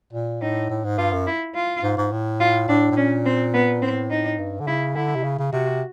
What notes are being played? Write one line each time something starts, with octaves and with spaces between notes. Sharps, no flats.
A#2
A2 D#4
A2
G#2
G2 F4
F#2
E4
F4
G#2
G#2
A2
F4
A2 D4
A2
A#2 C#4
C4
B3
A2 C4
D#4
G2
D3
C#3 E4
D3 E4
C3
C#3
C#3
C3 F#4